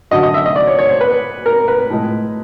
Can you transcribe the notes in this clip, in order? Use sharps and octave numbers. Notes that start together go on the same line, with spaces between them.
F#2 D3 F#3 D#5
D#5
E5
D#5
D5
C#5
C#5
C5
B4
A#4
B4
A2 F3 G#3